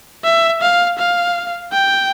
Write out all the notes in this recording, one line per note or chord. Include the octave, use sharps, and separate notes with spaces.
E5
F5
F5
G5